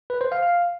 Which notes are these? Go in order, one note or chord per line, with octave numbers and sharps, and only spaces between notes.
B4
C5
F5
F5